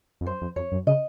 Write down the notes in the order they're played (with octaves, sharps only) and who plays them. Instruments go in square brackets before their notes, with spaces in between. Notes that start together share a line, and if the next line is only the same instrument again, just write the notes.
[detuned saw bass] F2
[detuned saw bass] F#2 [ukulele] C5
[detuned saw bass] F2
[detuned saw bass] F2 [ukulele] C#5
[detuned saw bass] F#2
[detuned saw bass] C#3 [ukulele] D#5